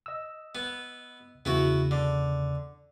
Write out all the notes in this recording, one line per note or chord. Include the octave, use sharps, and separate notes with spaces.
D#5 E6
B3
E2 C#3 B3 E4 F#4
D3